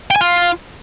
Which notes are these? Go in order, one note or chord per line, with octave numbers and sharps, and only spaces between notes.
G5
G#5
F4